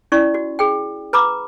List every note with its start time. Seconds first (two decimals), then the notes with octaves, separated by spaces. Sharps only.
0.12 C#4 E4 D5 C#6
0.34 F#4
0.59 G#4 G5
1.13 B4 A#5 B5 D6